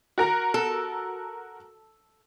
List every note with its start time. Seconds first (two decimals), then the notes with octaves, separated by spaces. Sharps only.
0.18 F#4 A#4 A#5
0.54 A4